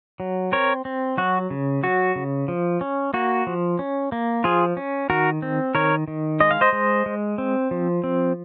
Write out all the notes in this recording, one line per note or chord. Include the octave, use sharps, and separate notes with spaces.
F#3
C4 A#4 C#5
C4
F#3 F#4
C#3
F#3 F#4
C#3
F3
C#4
A#3 F#4
F3
C#4
A#3
F3 F4 G#4
C#4
D#3 F#4 A#4
C4
D#3 A#4 C#5
D#3
G#3 D#5
F5
C5 D#5
G#3
G#3
C4
F3
C4